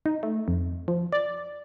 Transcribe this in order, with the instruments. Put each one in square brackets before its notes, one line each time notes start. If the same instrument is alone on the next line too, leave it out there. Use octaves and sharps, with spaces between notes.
[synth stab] D#4
A3
F2
F3
D5